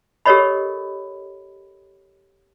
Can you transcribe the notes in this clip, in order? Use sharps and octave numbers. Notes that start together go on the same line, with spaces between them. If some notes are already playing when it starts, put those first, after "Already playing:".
G4 A4 A#4 C#5 D#5 B5